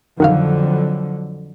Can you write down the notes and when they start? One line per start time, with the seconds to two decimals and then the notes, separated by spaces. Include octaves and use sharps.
0.20 F2 D3 D#3 F#3 F#4 F5